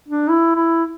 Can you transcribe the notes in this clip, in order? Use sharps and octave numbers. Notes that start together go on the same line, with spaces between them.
D4
E4
E4